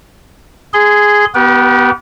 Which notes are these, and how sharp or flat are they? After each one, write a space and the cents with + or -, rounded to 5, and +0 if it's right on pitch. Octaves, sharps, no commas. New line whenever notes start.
G#4 +0 C6 -25
B3 +0 G4 -30 B4 -45